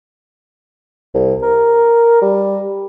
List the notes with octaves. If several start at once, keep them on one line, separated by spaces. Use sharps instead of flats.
C2
A#4
G3